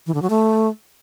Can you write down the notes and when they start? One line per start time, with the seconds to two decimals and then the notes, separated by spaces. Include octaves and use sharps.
0.07 E3
0.14 D3
0.22 F#3
0.30 A3